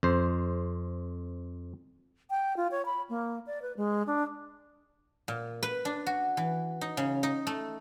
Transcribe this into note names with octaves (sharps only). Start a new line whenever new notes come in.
F2 C5
G5
F4
C#5
B5
A#3
D5
B4
G#3
D4
A#2
B4
D4
F#4
E3
D#4
C#3
D#4
A3